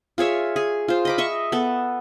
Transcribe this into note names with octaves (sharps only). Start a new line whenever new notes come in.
F4 G#4 C#5 E5
G#4
F4 C5
D#5 B5 D6
D#5 E5 C#6
B3 A4